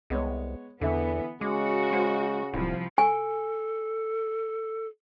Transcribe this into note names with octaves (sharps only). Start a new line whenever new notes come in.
C2 G#3 B3 C#5
E2 D3 E3 B3 E5
C#3 G#3 F#4 D6
G#3 C5
D1 C2 F3
A4 G#5